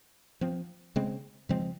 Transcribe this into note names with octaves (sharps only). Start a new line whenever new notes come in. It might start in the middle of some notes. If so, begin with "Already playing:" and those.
F3 C4
C#3 G#3 C4
C#3 F3 G#3 C4